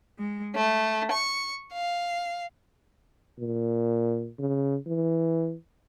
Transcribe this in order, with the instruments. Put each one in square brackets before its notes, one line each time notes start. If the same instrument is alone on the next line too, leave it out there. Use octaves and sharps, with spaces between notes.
[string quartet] G#3
A3
C#6
F5
[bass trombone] A#2
C#3
E3